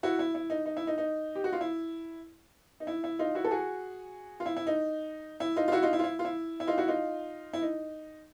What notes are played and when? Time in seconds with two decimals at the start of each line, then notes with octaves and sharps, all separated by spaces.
0.03 E4 F#4
0.19 E4
0.35 E4
0.50 D#4
0.66 D#4
0.77 E4
0.87 D#4
0.98 D#4
1.35 G4
1.44 F#4
1.53 F4
1.61 E4
2.80 D#4
2.87 E4
3.04 E4
3.19 D#4 F4
3.35 E4 F#4
3.44 A4
3.51 F#4 G#4
4.40 F4
4.46 E4
4.56 E4
4.67 D#4
5.40 E4
5.56 D#4 F4
5.68 F4
5.72 E4 F#4
5.83 D#4 F4
5.93 E4
5.99 F4
6.04 E4
6.19 F4
6.25 E4
6.60 E4
6.67 D#4 F4
6.78 E4 F#4
6.88 D#4 F4
7.53 E4
7.62 D#4